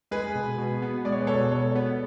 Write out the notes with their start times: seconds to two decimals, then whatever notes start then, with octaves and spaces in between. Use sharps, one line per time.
0.11 G#3 G#4 B4
0.35 B2
0.58 B2
0.82 B3
1.05 G#3 D5
1.12 C#5
1.20 B4
1.27 B2 A4 C#5
1.52 B2 A4 C#5
1.75 B3